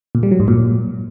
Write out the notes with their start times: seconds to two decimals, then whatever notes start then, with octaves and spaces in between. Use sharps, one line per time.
0.15 A#2
0.23 G3
0.31 F#3
0.40 G#2
0.48 A#2